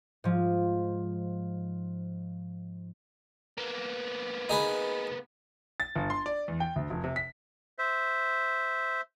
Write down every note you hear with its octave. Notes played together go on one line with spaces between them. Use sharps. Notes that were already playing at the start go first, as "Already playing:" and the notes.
G#2 F3
A#3 B3
D#4 G#4 B4
A6
G1
C6
D5
E2
G5
D2
F1
C3
B6
C5 E5